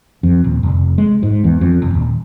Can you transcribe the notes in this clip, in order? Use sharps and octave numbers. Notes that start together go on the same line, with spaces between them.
F2
D#1
F1
G#3
G#2
E2
F2
F1
D#1